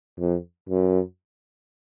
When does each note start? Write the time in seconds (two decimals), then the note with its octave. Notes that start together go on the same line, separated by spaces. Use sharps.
0.20 F2
0.70 F#2